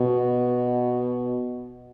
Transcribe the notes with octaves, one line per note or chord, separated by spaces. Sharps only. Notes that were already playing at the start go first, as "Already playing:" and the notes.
Already playing: B2